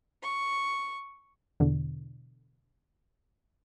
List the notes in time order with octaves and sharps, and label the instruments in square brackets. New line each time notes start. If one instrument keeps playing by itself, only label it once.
[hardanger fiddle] C#6
[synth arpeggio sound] E2 B2 D3